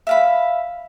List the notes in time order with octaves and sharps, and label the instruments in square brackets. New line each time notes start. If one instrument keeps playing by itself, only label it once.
[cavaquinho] E5 F5 B5